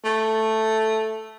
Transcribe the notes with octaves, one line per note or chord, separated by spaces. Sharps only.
A3